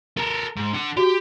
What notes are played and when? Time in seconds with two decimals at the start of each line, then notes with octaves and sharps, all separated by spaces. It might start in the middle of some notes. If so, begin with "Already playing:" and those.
0.17 A4 A#4
0.57 G#2
0.73 D3 F#5
0.97 F#4 G4